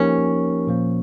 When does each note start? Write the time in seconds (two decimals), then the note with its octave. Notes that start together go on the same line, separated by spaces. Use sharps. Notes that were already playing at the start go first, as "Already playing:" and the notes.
Already playing: F3 A#3 C#4 D#4 G4 A#4
0.67 A#2 F3 A#3